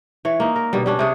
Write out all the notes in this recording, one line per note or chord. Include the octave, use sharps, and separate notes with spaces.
E3 C#5
A#3 D#4
A#4
B2 D3 G3
G3 C#4 D4
C3 G#4 C#5